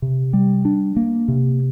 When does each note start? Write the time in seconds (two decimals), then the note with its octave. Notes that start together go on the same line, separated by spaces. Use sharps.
0.02 C3
0.33 G3
0.65 D4
0.96 A#3
1.28 C3